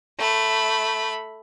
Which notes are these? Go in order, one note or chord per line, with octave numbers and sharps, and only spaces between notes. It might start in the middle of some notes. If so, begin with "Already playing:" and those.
A3 B5